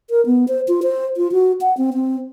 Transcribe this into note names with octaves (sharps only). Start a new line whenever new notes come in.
A#4
B3
C5
F4
C5
F4
F#4
F#5
C4
C4